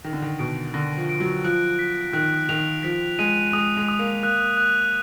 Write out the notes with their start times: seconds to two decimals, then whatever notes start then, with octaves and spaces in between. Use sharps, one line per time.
0.04 D#3 A#6
0.13 D3
0.22 D#3
0.39 B2 D7
0.74 D3 A#6
0.97 F3
1.09 D7
1.20 F#3
1.44 F3 F#6
1.79 B6
2.13 D#3 F#6
2.49 D#3 F7
2.83 F3 B6
3.19 G#3 D#7
3.53 G#3 D#6
3.77 G#3
3.88 D#6
3.99 A#3
4.23 A#3 F#6
4.57 F#6